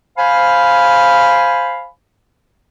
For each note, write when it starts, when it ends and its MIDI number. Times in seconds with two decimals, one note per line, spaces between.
0.18 1.90 72
0.18 1.90 77
0.18 1.90 80
0.18 1.90 83